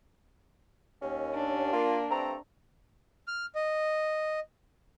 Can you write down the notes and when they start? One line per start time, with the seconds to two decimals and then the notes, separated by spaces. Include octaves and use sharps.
1.02 D#2 C#4
1.35 D4
1.72 A#3 F4
2.10 G2 A3 C4 A#5
3.28 F6
3.55 D#5